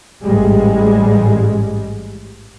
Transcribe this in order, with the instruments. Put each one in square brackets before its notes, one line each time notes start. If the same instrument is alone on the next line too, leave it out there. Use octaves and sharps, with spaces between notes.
[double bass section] A1 G#2 G3 G#3